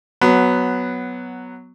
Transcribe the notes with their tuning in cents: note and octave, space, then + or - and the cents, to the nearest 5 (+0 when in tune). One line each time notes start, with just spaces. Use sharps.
F#3 +0 B3 +5